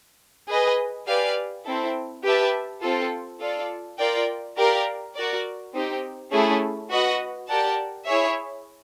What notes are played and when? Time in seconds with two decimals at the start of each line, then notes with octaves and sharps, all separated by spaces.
0.48 G#4 B4 D#5
1.07 G4 B4 D5 F5 G#5
1.65 C4 E4 A4
2.23 G4 B4 E5 A5
2.82 C4 F4 A4
3.40 F4 A4 D5
3.98 F4 A#4 D5 G5
4.57 G4 A#4 D5 F5
5.15 F#4 A#4 D5
5.74 C4 D#4 G4
6.31 A3 C#4 E4 G#4
6.90 F#4 B4 D#5 F#5
7.49 G4 A#4 D5 F#5 A5
8.07 E4 G#4 C#5 E5